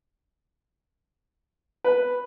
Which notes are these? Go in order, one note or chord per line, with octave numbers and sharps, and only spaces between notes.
B4